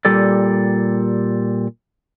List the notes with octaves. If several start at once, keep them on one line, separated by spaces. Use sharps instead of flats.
A#2 G3 G4 A4 D5